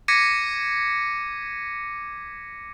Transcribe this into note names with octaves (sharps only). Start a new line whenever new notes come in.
D6 G#6 A#6 B6 C#7 D#7